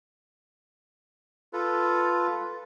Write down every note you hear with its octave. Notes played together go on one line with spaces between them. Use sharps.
F4 A4 B4